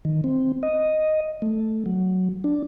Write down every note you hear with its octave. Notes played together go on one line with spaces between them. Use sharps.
D#3
C4
D#5
A3
F#3
D4